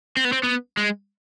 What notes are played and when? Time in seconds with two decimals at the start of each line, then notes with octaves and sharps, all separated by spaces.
0.17 C4
0.25 B3
0.32 C4
0.43 B3
0.77 G#3